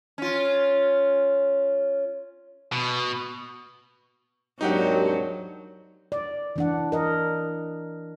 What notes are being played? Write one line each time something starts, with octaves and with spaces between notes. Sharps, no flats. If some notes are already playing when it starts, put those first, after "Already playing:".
C#4 F4
B2
D#2 G#2 F#3 C4 D4 D#4 G4 F#5
D5
E3 D4 F#5
A#4 D#5